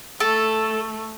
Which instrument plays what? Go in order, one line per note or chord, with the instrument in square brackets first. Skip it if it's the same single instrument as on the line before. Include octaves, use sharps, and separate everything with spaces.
[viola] A3 [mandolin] A4